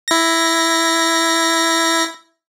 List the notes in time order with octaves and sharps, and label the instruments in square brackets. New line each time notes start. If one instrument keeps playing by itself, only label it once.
[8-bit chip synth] E4 A#6